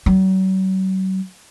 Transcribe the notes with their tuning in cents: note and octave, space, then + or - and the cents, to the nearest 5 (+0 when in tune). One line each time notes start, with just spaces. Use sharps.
F#3 +40